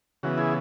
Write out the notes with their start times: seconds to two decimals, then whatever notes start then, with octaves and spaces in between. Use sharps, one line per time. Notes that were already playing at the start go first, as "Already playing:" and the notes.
0.23 C#3 E3 B3 F#4
0.38 E4 G#4